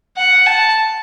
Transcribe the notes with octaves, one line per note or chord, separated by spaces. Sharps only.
F#5
A5